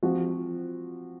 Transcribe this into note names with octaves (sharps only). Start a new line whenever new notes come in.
F3 C4 F#4